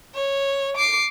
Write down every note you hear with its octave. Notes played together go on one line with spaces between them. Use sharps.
C#5
D6 C7